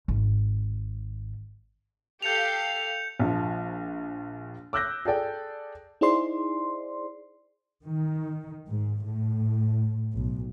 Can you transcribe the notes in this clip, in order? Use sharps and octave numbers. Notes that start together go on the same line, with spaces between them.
G#1
G4 A4 F5 G6 C#7 F7
A#1 F3
D6 E6 F#6 G6 A#6
G#4 A4 D5 G5
D#4 E4 G#4 C5 D5 C6
D#3
G#2
A2
B1